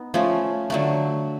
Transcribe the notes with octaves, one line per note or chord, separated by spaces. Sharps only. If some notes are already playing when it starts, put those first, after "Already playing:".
Already playing: B3 D#4
F3 A3 C#4
D3 F#3 A3